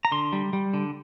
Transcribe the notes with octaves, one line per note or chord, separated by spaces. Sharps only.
A#5
D3 C6
G3
G3
D3